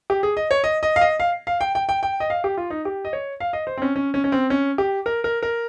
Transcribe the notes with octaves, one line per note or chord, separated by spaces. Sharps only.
G4
G#4
D#5
C#5
D#5
D#5
F5
D#5
F5
F5
G5
G5
G5
G5
D#5
F5
G4
F4
D#4
G4
D#5
C#5
F5
D#5
C5
C4
C#4
C#4
C#4
C#4
C4
C#4
G4
A#4
A#4
A#4